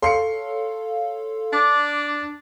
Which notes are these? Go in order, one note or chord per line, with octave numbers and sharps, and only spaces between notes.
A4 C#5 F5 C6 C7 C#7
D4 D6